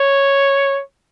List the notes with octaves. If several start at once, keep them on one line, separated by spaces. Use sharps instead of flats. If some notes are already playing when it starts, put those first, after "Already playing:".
Already playing: C#5